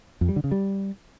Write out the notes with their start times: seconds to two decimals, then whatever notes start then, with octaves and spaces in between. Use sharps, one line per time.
0.21 F2
0.29 G3
0.36 D3
0.44 C#3
0.51 G3